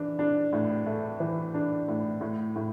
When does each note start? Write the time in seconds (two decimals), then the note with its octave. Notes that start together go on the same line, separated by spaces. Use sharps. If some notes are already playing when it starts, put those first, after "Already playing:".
Already playing: E3 D4
0.19 D4
0.53 A2
0.86 A3
1.20 E3
1.54 D4
1.88 A2
2.21 A2
2.56 A2